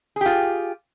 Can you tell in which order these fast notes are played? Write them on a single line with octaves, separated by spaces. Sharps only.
G#4 G4 F4